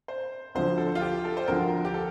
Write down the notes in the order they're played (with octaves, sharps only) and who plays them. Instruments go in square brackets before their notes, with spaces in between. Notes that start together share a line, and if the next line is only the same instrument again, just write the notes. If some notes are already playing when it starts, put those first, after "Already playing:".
[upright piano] C5
[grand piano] D2 D3 F3 [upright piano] C5
[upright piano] A4
F4
G4
A4
C5
[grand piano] D2 D3 F3 [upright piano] A#4
[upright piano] G4
A4